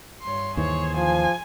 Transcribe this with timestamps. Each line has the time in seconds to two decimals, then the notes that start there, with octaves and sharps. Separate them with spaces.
0.22 G2 C#5 C6
0.57 D#2 D#3 E3 G#4 C5 C#5
0.97 F3 G#5